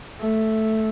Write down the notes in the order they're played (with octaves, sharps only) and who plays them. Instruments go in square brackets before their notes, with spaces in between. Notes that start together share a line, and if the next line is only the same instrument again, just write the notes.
[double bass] A3